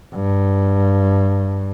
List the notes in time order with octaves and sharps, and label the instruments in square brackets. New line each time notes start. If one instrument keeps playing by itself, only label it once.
[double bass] G2